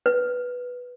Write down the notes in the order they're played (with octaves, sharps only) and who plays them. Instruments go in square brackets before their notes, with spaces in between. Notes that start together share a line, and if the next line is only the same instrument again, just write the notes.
[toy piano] B4